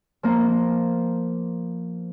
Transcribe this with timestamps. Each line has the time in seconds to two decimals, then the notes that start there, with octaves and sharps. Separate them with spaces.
0.23 F3 A#3